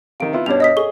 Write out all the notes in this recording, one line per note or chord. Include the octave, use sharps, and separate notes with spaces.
C3 D#3 F5 D7
B3 E4 F4
G2 B2 D4 C#5 F7
D#5 D#6 B6
G#4 A4 C#6 G7